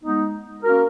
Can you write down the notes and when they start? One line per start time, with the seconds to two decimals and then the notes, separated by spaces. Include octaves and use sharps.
0.03 G#3 B3 D#4
0.62 A#3 C#4 F#4 A#4